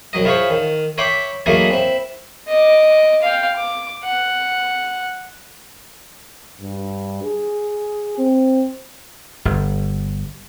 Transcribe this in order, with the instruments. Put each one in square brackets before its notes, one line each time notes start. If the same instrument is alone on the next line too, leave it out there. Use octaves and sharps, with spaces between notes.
[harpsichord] C2 F#3 D#5
E4 F4 G#4 C5 C#5
D#3
C#5 E5 G5 B5 C6 D6
F#3 A3 A#3 D#4 E4 G#4
C4 E4
[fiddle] D#5 D6
F5 G5
D6
F#5
[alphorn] G2
G#4
C4
[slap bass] G1